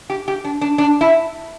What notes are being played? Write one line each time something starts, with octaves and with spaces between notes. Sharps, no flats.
G4
G4
D4
D4
D4
E4